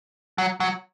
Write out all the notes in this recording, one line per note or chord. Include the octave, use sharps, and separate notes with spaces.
F#3
F#3